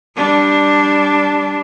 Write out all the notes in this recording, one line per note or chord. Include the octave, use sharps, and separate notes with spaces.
G3 D4